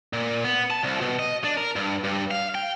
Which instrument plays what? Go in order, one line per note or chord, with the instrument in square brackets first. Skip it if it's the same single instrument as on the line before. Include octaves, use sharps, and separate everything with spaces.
[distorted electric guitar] A#2
B3
A5
C2
B2
D#5
D4
A#4
G2
G2
F5
G5